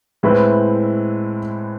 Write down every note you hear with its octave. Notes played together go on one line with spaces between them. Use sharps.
A2 G#3 C4 E4 B4